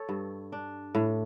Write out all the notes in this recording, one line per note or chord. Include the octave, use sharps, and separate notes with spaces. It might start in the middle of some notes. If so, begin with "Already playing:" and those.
Already playing: A4 C#5
G2
D4
A2